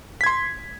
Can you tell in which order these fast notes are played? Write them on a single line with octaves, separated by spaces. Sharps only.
B6 G#6 C6